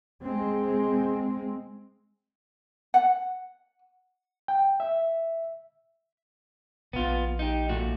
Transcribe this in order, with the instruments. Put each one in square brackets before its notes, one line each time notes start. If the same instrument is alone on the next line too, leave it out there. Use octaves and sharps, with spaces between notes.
[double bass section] G#3 C4
[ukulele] F#5
[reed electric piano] G5
E5
[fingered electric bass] A#1 [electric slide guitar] B3 F4
[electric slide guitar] D#4 G4
A#2 A3 F#4